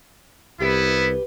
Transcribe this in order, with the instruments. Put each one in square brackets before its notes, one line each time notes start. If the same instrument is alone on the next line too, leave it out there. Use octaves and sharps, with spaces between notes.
[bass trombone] C2 [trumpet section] B3 E4 [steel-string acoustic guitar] G4 B4